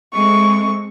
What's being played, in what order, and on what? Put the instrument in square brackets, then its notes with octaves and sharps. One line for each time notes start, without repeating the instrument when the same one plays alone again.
[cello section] G#3 C4 [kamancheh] A3 C#6